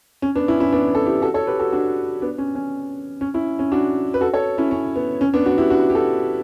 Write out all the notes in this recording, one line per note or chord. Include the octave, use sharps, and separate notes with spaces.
C#4
B3 D4
C#4 E4
C#4 E4
B3 D4
A4
E4 G4
F#4 A4
A4 C#5
G4 B4
F#4 A4
D4 F#4
B3 D4
C#4
C#4
C#4
C#4 E4
C#4
D4 F#4
B4
F#4 A4
A4 C#5
C#4 E4
C#4
B3
C#4
B3 D4
D4 F#4
E4 G4
D4 F#4
G4
F#4 A4